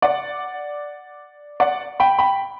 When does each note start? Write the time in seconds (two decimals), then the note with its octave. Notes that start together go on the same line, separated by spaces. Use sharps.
0.02 D5 F#5
1.60 D5 F#5
2.00 G5 B5
2.19 G5 B5